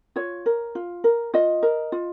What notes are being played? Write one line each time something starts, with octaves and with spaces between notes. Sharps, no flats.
F4 C#5
A#4
F4
A#4
F4 D#5
A#4
F4